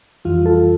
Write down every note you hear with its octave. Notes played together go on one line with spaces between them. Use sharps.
F2 E3 G3 F4
F4 A4